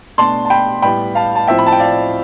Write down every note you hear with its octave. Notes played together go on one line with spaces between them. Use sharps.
B2 A3 D4 A5 C6
A5
G5 B5
A2 G3 B3 G5 B5
F5 A5
A5
A2 F3 C4 E5 G5
B5
A5
G5
D5 F5